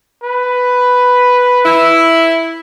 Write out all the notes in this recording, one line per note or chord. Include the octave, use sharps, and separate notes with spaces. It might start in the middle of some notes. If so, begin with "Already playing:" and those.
B4
E4